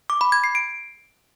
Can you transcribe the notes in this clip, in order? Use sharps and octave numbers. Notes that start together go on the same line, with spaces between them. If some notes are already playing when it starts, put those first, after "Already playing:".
D6
B5
G#6
C7
D7